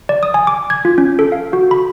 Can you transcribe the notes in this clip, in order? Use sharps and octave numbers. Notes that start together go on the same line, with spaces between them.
D5
D#6
G#5
D6
G#6
F4
C#4
A4
F5
F#4
B5